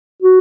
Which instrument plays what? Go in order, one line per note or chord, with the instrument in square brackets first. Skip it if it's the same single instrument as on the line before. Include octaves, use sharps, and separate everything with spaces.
[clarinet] F#4